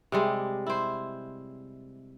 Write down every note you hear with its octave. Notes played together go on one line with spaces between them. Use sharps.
C3 G3 G#3
E4 C5